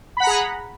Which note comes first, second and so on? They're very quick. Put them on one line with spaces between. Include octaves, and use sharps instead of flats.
B5 F#5 A#5 G#4